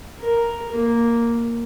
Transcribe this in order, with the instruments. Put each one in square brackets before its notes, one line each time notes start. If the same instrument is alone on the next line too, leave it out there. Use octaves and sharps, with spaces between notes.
[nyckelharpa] A#4
A#3